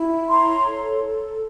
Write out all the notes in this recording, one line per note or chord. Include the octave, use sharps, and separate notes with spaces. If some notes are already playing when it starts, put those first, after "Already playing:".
Already playing: E4
C#5 A#5 C6
A4
A4